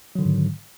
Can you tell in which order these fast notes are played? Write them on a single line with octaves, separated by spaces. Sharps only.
F#3 D3 D#3 G#2